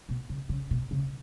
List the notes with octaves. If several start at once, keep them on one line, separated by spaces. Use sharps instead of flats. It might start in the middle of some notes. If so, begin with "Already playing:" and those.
B2
C#3
C#3
B2
C#3